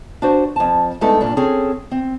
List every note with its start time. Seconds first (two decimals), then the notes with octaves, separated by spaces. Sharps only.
0.22 D4 F#4 C5
0.56 F2 A5
1.01 G2 G#3 A3 B3 D#4 A4
1.21 G2 A#2 D4
1.37 C4 C#4 G#4 A4
1.91 C4